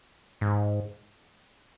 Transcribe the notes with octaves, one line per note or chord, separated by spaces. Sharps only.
G#2